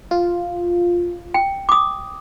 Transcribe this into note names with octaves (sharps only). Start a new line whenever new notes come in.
F4
G5
D6 D#6